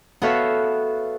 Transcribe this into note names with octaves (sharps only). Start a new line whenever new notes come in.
B3 F#4 A4 C#5 E5 F5